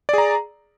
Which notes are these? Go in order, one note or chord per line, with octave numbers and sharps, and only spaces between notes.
G#4 D5 A#5